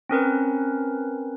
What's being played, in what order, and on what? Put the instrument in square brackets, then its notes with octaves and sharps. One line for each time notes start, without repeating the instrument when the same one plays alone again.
[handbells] C4 C#4 A#4 B4